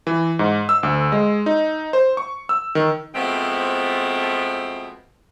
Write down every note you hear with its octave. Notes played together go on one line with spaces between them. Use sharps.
E3
G#2
E6
D2
G#3
D#4
C5
C#6
E6
D#3
B2 F3 G#3 A3 B3 C4